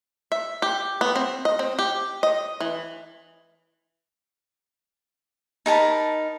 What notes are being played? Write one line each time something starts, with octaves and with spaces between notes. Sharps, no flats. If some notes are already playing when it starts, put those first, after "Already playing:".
E5
G4
B3
C4
D#5
C4
G4
D#5
E3
D#4 A#4 A5 B5